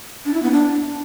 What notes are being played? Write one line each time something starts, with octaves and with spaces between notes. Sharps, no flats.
D4
E4
B3
D4